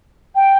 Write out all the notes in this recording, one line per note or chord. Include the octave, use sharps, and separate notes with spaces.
G5